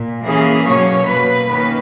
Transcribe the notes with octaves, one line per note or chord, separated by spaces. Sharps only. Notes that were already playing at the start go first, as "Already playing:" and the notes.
Already playing: A#2
E3 A#3 C#4 G#4
B2 F#3 A#3 C#4 C#5
B2 F#3 A#3 B4
D#3 A#3 C#4 B4